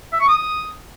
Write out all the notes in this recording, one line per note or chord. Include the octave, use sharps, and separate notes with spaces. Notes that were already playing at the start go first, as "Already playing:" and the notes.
E5
C#6
D#6